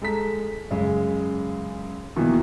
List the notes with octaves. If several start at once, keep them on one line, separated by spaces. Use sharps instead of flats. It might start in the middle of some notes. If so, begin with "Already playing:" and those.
G#3 A4 A#5 B6
F#2 C#3 G#3
E2 B2 D#3 E3 F#3 A#3